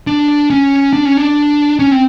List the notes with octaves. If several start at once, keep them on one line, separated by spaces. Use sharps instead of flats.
D4
C#4
D4
C#4
D4
C#4
C4